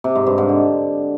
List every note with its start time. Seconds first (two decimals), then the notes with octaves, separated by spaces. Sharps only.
0.04 C3
0.15 G#2
0.27 G2
0.38 G#2
0.49 D3